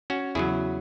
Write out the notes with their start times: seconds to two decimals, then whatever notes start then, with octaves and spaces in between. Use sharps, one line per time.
0.10 C#4 F#4
0.35 E2 C#3 F#3 E4 G#4